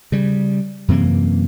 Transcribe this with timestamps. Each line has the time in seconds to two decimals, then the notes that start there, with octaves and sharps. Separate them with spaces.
0.12 C#3 G3
0.88 F#2 C3 E3 A#3